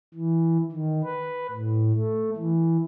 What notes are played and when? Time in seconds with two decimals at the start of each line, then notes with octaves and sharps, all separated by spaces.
0.14 E3
0.72 D#3
1.04 B4
1.51 A2
1.94 A3
2.36 E3